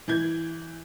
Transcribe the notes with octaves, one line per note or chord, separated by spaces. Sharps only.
E3 G6 G#6